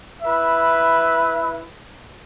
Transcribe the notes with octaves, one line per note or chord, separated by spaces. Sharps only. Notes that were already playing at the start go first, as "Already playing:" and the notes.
E4 B4 E5